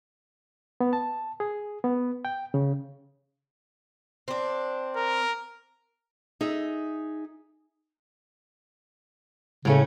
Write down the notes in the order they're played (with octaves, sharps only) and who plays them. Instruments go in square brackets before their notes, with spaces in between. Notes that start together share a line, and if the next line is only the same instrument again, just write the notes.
[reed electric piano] B3
A5
G#4
B3
G5
C#3
[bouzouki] C4 D4
[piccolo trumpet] A#4
[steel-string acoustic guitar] D#4 G#4 E5
[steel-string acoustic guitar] A2 A3 C#4 [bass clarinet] C#3